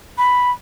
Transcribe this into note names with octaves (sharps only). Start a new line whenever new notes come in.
B5